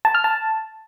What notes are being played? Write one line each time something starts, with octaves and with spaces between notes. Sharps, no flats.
A5
F6
A5